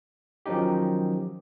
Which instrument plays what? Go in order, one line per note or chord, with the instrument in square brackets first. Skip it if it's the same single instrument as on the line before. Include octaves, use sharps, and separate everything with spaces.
[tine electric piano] D#3 F3 F#3 C#4 D#4 G4